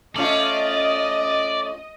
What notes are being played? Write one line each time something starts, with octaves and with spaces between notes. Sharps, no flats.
A3 C#4 F4 D5 D#5